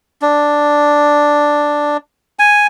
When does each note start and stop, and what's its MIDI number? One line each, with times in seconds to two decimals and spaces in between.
0.22 1.97 62
2.39 2.67 80